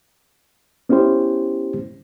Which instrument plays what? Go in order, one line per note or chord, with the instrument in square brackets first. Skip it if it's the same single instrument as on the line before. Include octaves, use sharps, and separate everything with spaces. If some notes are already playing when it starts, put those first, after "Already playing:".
[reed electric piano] B3 C#4 E4 G4 C5